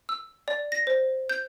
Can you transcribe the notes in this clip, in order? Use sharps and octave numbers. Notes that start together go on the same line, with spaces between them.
E6
D5
A#6
C5
G6